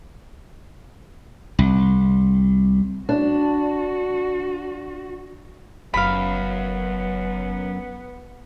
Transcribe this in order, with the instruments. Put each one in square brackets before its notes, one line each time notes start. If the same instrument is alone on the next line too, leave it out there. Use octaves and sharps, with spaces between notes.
[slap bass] C2
[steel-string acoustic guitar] D4 [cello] F#4
[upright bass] F#1 [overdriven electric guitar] F#2 [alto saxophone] B3 [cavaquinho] F5 B5